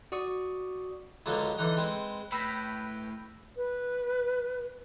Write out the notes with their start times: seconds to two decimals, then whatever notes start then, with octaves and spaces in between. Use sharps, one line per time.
0.12 F#4 D5 C#6 D#6
1.26 C#2 D3 F#3 D#5 F5 C6
1.57 D3 E3 D#4 F#5 A#5 D#6
1.77 G#3 C4 B4
2.32 A2 B4 G5 B5 E6 A#6 B6
3.56 B4